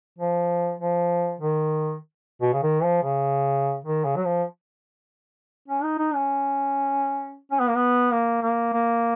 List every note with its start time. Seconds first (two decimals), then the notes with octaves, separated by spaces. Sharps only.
0.19 F3
0.80 F3
1.40 D#3
2.42 B2
2.53 C#3
2.63 D#3
2.83 F3
3.03 C#3
3.85 D#3
4.05 C#3
4.16 F#3
4.25 F3
5.68 C#4
5.83 D#4
5.98 D#4
6.14 C#4
7.51 C#4
7.59 B3
7.68 A#3
7.75 B3
8.12 A#3
8.42 A#3
8.73 A#3